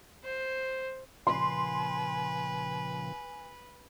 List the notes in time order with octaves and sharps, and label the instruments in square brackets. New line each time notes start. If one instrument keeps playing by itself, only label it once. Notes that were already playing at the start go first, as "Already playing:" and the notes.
[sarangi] C5
[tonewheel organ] A#2 C#3 F3 [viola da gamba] B4 [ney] G#5 [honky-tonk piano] C6